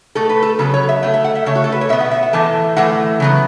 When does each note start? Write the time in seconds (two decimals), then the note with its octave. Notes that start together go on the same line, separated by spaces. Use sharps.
0.15 B2 A3 A4
0.29 B4
0.42 A4
0.59 C#3 F#3 B3 A4
0.74 C#5
0.89 E5
1.03 C#3 A3 F#5
1.14 E5
1.24 F#5
1.35 E5
1.46 C#3 A3 C#5
1.55 F#4
1.64 A4
1.72 B4
1.81 C#5
1.89 B2 E5
1.93 B3
2.00 F#5
2.11 E5
2.23 F#5
2.33 A2 E3 A3 A5
2.76 A2 E3 A3 F#5
3.20 C#3 F#3 B3